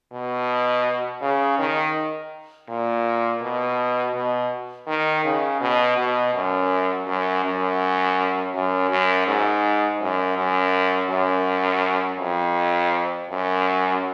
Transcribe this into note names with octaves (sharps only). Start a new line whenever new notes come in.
B2
C#3
D#3
A#2
B2
B2
D#3
C#3
B2
B2
F#2
F#2
F#2
F#2
F#2
G#2
F#2
F#2
F#2
F2
F#2